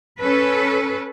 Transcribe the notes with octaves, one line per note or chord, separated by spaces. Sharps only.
C#4 A4 B4